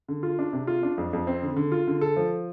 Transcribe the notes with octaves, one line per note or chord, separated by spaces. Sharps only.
D3
F4
D4
C3
F4
D4
F2
F2
C4
D3
D3
F4
D3
A4
F3